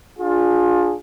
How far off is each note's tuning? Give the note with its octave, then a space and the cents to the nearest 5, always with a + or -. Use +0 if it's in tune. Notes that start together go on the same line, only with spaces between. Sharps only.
D4 +0 F4 +20 G#4 -5